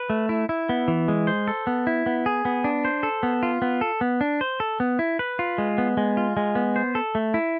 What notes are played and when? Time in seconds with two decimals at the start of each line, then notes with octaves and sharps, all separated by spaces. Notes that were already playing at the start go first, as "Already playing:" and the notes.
Already playing: B4
0.10 A3
0.29 E4
0.49 E4
0.69 B3
0.88 E3
1.08 G#3
1.27 C5
1.48 A4
1.67 B3
1.87 E4
2.06 B3
2.26 G#4
2.45 B3
2.64 D4
2.85 C5
3.03 A4
3.23 B3
3.43 F4
3.62 B3
3.81 A4
4.01 B3
4.21 D4
4.41 C5
4.60 A4
4.80 B3
4.99 E4
5.19 B4
5.39 F4
5.58 G#3
5.78 B3
5.97 G#3
6.17 F4
6.37 G#3
6.55 B3
6.76 C5
6.95 A4
7.15 A3
7.34 E4